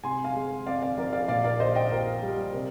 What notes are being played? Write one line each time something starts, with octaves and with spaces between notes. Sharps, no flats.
C3 G#5 C6
F5 G#5
G#3
F2 D5 F5
D5 F5
F3 A#4 D5
D5 F5
A#2 D5 F5
A#4 D5
A#1 C5 D#5
D#5 G5
A#1 A#4
G3
C3 A#4